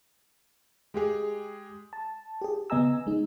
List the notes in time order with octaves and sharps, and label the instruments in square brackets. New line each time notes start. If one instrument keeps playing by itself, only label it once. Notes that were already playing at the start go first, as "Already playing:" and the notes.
[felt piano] G#3 G4 G#4
[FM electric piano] A5
G4 G#4
C#3 B3 D#5 G#5 A#5 E6
G#3 D#4